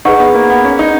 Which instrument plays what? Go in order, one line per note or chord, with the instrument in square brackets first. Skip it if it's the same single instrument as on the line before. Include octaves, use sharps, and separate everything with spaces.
[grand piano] D#4 [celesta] G#4 B4 F#5 C#6
[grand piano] B3
A#3
B3
C#4
D#4